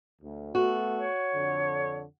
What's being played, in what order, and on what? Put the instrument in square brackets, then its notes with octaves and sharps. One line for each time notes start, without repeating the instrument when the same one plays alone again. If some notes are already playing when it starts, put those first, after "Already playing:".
[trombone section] D2
[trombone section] A3 B3 A4 [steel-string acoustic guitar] F#4
[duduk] C#5
[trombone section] F2 D3